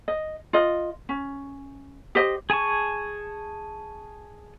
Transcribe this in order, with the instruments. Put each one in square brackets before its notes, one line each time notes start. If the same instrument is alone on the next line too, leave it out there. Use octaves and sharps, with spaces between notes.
[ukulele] D#5
F4 D#5
C#4
G4 C5 D#5
[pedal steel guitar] G#4 G#5 A5 C#6